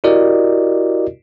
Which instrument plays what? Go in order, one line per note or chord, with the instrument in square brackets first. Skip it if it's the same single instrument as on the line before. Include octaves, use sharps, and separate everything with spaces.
[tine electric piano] E4 F#4 G4 A#4 D5 D#5